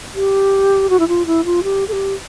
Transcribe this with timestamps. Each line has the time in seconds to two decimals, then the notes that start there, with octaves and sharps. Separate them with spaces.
0.15 G4
0.90 F#4
0.99 E4
1.08 F4
1.26 E4
1.45 F4
1.64 G4
1.88 A4
1.92 G4